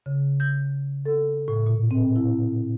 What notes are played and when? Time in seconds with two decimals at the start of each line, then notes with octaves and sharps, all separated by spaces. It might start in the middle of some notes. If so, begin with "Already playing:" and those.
0.06 C#3
0.40 G6
1.05 A4
1.48 A2
1.66 A#2
1.91 C4
2.16 E4